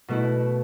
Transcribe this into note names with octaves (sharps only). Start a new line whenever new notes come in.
B2 A3 E4